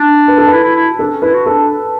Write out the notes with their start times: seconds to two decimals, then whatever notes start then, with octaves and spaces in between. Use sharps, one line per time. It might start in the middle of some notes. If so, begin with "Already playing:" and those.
Already playing: D4
0.28 B4
0.38 A4
0.47 B4
0.52 E4
0.63 E4
0.75 E4
0.98 D4 A4
1.10 C#4
1.22 E4 B4
1.34 F#4
1.46 D4 A4